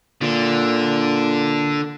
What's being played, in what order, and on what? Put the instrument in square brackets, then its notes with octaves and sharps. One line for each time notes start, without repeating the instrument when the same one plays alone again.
[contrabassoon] A#2 [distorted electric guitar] D3